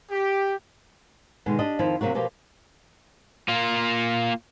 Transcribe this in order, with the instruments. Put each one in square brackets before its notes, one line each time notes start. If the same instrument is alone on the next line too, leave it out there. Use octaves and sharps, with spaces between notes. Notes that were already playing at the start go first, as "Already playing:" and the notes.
[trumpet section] G4
[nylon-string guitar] B2 D3 D#3 G#3
D4 G4 D#5
F2 D#3 F3 E4 F5
C3 F#3 A#3 F#4
B2 F3 A#3 G4
[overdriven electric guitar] A#3 F4